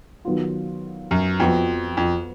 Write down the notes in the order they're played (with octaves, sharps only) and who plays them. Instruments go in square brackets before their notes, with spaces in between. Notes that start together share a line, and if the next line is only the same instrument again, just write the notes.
[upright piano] D#3 F#3 B3 F4
[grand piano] F#2
[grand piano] F2 [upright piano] F3 B3 F#4
[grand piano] F2